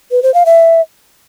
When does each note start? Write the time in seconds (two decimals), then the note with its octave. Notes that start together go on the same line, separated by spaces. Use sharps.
0.11 B4
0.23 C5
0.34 F5
0.46 E5